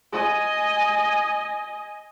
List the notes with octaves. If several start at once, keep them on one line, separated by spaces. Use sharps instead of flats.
D#5 G#5